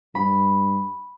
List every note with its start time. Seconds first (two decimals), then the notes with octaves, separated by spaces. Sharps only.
0.15 G2 B5